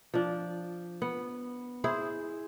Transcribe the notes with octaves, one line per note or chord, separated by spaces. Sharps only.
F3 D4
B3
E4 G#4 C5